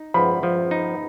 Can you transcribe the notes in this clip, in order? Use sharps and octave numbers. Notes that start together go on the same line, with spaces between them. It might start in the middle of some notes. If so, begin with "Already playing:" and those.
Already playing: D#4
F3 B5
F3
D#4